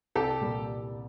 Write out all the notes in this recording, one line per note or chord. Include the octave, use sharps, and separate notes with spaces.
C2 G4 A4
A#2 G3